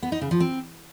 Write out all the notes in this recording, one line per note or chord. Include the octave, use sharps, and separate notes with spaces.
B3
D#4
C#3
F3
C4